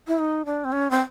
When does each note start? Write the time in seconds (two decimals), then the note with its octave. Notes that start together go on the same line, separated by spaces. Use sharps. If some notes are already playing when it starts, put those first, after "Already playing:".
0.07 E4
0.19 D#4
0.45 D4
0.64 C4
0.72 C#4
0.91 C4